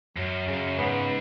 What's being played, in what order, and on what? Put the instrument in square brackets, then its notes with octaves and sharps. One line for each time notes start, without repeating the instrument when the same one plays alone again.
[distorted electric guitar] F#2 [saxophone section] F#3
[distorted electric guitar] F#2 [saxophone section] C#3
[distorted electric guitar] G#2 [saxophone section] B3